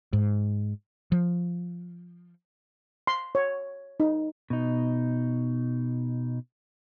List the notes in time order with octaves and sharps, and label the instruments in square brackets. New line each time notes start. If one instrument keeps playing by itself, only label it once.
[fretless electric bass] G#2
F3
[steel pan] C6
C#5
D#4
[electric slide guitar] B2 D#4